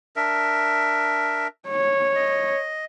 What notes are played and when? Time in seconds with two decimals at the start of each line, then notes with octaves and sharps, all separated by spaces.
0.16 D4 A#4 E5
1.69 C#5
2.15 D#5